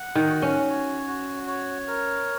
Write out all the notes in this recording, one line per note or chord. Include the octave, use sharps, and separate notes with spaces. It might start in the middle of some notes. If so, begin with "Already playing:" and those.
Already playing: F#5
D#3
F#4
C#4
C#5
F#4
C#5
A#4